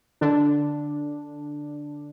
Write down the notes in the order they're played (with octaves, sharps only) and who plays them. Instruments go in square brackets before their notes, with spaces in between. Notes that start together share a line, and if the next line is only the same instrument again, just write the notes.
[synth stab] D3 D4